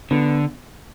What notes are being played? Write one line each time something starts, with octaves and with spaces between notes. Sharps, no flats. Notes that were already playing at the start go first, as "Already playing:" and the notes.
D3 B3